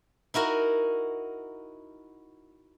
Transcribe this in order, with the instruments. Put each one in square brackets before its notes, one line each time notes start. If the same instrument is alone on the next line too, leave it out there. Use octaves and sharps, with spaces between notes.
[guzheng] D#4 E4 F#4 A#4